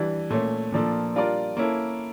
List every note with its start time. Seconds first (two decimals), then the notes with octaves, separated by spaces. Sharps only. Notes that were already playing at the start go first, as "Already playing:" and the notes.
Already playing: E3 G3 D4
0.30 A#2 A3 C#4
0.72 A#2 F3 A#3 D4 A4
1.15 G3 D4 F4 A#4 D5
1.57 A#3 C#4 E4 A4